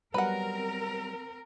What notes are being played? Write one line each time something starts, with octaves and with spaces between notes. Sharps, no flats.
F#3 G3 B3 C4 A#4 B4 F#5